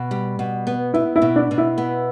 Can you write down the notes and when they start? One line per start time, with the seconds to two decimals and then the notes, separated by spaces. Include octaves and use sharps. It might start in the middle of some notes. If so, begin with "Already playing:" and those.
Already playing: B2
0.11 G3
0.39 B2
0.67 B3
0.94 B3 E4
1.16 E4
1.22 B2
1.36 D4
1.51 B2
1.58 E4
1.78 B3